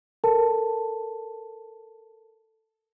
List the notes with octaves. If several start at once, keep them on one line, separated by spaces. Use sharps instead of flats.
A4 A#4 A5